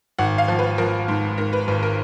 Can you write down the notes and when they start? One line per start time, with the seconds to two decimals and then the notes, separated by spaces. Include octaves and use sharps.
0.18 G#1 F#5
0.38 F5
0.48 F3
0.59 B4
0.78 F3 A#4
1.08 G#2
1.38 G#2 A#4
1.53 B4
1.68 G#1 B4
1.83 A#4